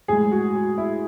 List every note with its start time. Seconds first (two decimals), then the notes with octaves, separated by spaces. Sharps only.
0.08 A2 G#3 G#4
0.31 F#4
0.55 F#4
0.78 E4